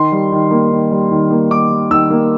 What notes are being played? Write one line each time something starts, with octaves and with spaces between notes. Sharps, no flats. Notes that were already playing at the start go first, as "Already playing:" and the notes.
Already playing: D#3 C6
G3
D#3
A#3
D#3
G3
D#3
A#3
D#3 D6
G3
D#3 E6
A#3